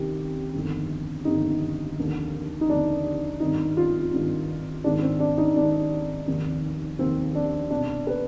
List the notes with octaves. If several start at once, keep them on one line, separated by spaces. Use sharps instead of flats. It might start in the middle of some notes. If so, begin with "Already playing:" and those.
Already playing: C2 C3 D#3 G4
G1 F2 D#3
G1 F2 D#3 D#4
F1 D#2 D3
D#4
F1 D#2 D3 D4
G#1 G2 D#3 D#4
F4
G#1 G2 D#3
G#1 G#2 D#3 D4
C4
D4
D#4
G#1 G#2 D#3 D4
F1 D#2 D#3
F1 D#2 D#3 C4
D4
C2 B2 D4
B4